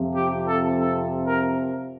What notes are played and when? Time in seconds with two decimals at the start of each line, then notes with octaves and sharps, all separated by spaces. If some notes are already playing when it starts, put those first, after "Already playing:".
Already playing: F2 C3 F3
0.15 G4
0.47 A4
0.78 A4
1.25 A#4